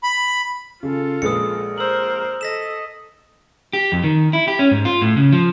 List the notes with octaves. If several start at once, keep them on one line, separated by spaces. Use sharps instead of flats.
B5
C#3 F4 A4
A#1 G#3 B4 D#6 C#7
A#4 C5 E6 F#7
A4 D#5 A#6 B6 E7
G4
F2
D#3
E4
G4
C#4
G#2
F4
A2
C#3
F3